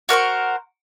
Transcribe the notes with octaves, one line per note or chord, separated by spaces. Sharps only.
F#4 A#4 C5 C#6